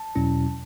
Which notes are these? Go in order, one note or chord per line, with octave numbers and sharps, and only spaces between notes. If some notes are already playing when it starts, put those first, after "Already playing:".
Already playing: A5
E2 B2 F#3 C#4 E4